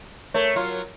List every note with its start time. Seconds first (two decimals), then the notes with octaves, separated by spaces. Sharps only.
0.34 A3 A#4 C#5
0.56 F#3 F4